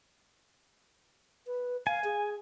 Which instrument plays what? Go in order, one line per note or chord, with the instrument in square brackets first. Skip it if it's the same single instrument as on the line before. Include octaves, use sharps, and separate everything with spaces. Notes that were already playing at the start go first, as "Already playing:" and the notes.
[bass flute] B4
[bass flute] F5 [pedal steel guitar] G#5
[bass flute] G#4